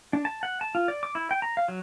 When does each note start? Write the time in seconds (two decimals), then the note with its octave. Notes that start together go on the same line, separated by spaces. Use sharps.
0.13 D4
0.25 A5
0.43 F#5
0.61 A5
0.75 F4
0.88 D5
1.03 D6
1.15 E4
1.31 G5
1.42 A#5
1.57 F5
1.68 F#3